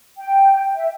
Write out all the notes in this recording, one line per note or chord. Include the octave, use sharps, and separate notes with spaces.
G5
E5